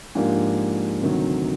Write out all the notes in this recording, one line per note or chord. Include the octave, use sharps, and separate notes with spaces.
G#2 F3 A#3 D4 G4
D2 C3 D#3 F#3